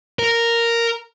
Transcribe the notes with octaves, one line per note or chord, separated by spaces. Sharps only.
A#4